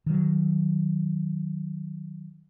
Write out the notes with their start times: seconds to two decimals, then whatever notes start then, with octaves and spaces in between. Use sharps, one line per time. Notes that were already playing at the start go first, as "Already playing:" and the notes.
0.06 D#3 F#3